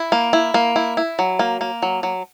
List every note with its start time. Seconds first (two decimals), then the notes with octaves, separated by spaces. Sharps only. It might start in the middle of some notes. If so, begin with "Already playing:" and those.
Already playing: E4
0.12 A#3
0.33 E4
0.54 A#3
0.76 E4
0.97 E4
1.19 F#3
1.39 A#3
1.61 A#3
1.82 F#3
2.03 F#3